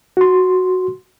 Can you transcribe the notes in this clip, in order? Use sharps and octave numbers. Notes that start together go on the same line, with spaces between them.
F#4 C6